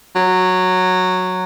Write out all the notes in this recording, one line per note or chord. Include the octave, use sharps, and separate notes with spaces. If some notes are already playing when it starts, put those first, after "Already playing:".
F#3